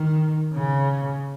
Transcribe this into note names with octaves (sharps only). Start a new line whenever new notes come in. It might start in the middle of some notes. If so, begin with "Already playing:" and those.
Already playing: D#3
C#3